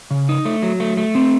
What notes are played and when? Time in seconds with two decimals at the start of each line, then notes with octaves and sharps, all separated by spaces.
0.11 C#3
0.29 D#4
0.45 A3
0.63 F#3
0.80 A3
0.97 A3
1.15 C4